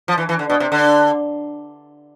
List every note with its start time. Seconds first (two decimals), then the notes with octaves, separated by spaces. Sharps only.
0.08 F3
0.18 E3
0.29 E3
0.39 D3
0.50 B2
0.60 C3
0.72 D3